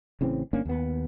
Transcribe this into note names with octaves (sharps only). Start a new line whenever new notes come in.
A1 C#3 E3 C4
G1 A#3 C#4 D4
D#2 B3